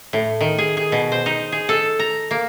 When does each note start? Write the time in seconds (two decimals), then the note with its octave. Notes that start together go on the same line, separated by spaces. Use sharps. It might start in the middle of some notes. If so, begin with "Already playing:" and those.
0.13 A2
0.41 D#3
0.58 G#4
0.77 G#4
0.92 B2
1.12 C5
1.26 D#4
1.52 G#4
1.69 A4
1.99 A#5
2.31 A#3